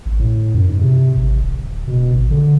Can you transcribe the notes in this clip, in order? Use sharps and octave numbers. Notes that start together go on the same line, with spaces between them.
G#1
A2
F#2
G#2
C3
G#1
D1
B2
G#1
D3